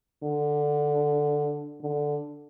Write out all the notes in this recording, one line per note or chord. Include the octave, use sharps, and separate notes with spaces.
D3
D3